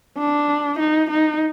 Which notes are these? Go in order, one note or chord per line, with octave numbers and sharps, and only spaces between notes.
D4
D#4
D#4